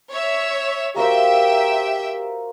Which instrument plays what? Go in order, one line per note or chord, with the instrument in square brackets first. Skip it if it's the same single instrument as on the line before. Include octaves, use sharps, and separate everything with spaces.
[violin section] C#5 E5
[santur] A#3 F#4 C5 [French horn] G4 [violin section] E5 G5